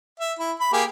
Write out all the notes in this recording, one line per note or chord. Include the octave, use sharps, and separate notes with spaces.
E5
E4
B5
A#3 G4 G#4